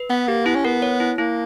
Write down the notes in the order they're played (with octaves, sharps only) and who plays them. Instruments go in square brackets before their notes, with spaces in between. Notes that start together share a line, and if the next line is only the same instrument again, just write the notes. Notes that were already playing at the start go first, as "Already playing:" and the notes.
Already playing: [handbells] B4
[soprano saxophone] B3 [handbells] F#5
[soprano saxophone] A#3 [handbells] G4
[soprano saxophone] B3 [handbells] E4
[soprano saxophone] C#4
[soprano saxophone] B3 [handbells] A#4
[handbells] C#5
E4
[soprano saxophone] A#3 [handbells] E4